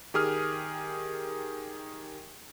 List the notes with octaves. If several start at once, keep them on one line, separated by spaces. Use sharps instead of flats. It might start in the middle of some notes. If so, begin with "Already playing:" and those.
D#3 G4 G#4 D#6 F6